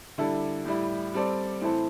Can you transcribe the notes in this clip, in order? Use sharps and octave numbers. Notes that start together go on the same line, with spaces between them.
D3 G3 E4 A4
A2 G3 E4
G3 C4 A4 D5
A2 E3 C4 E4 A4